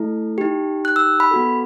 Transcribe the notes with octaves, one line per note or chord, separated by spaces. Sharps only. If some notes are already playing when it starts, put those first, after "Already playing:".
Already playing: A3 E4 A4
D#4 G4
F#6
E6
B5
B3 F#4 A4